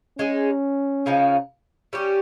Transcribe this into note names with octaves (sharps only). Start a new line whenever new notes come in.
G#3 C#4 D#4 G#4
C#3 F3 G#3 D#4
G3 C#4 G4